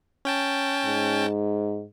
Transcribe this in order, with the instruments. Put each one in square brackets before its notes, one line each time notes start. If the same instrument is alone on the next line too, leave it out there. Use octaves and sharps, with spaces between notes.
[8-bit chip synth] C#4 G5 A5
[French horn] G#2